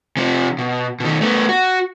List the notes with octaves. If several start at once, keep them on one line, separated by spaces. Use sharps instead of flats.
C3 F3
B2
B2 D#3
A3 B3
F#4